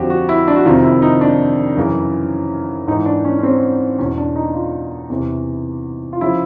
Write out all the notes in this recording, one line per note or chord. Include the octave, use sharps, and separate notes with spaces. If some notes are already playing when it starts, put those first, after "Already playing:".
Already playing: F2 D3 F3 F#4 G4
F#4
E4
D4
F#4
F2 C3 D#3 F4
E4
D#4
D4
F#2 C#3 E3
G#2 E3 D#4
D4
C#4
C#4
C4
E2 B2 C#4
D4
D#4
F4
E2 C3 E3
F4
C#3 F3 E4